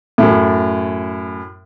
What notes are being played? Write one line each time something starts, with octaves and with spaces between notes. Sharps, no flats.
F#2 A2